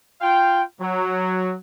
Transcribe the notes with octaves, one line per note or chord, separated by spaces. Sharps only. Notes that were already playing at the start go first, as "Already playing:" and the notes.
F4 F5 G5
F#3